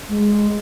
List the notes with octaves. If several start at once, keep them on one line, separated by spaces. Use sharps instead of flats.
G#3